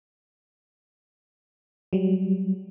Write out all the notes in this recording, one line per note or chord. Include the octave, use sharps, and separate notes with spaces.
F#3 G3